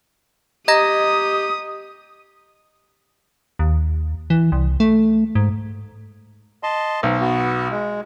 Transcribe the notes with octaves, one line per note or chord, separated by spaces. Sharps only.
G4 D#5 A#5 D#6 A#6
D#2
E3
C2
A3
G#2
D#5 A5 C6
B1 C5
B3 F#4
G#3